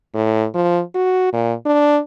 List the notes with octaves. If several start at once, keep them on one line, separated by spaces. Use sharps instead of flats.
A2
F3
F#4
A#2
D4